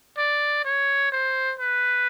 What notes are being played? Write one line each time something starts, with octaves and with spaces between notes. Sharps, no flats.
D5
C#5
C5
B4